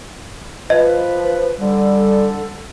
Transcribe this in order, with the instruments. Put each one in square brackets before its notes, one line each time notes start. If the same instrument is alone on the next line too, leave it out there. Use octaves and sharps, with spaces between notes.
[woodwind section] F3 B4 [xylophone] D#5
[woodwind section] D3 A4 [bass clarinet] G3